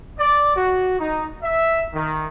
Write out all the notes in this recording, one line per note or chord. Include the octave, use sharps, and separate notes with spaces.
D5
F#4
D#4
E5
D#3